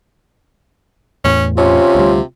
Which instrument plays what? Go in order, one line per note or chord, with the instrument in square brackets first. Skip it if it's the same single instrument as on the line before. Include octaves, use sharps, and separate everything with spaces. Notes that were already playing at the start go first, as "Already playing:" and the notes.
[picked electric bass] E2 A2 [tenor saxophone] C#4
[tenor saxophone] C3 [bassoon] C#4 [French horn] F4
[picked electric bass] D2 G3